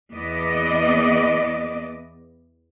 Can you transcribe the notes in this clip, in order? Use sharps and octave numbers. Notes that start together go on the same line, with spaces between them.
E2 B3 D5 D#5